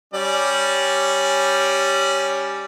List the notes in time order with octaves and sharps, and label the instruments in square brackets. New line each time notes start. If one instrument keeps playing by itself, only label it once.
[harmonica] G3 C#4 D5